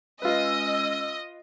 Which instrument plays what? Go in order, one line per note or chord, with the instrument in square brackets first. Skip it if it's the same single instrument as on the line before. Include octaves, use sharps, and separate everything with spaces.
[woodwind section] G#3 C#4 E6 [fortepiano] F4 B4 [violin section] D#5